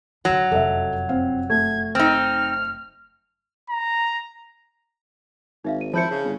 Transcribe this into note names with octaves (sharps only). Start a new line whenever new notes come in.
G#2 D3 F#3
F1 F#2 A4 D#5 E5
C4 F5
A3 G#6
C4 D#4 F6
A#5
G#1 D#4 E5 F5
D#7
F3 E4 G#4 C5 A5 G6 C#7
C#3
G1